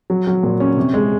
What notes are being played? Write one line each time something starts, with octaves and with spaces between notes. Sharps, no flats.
F#3
F#3
A#2
C#4
C3
G#3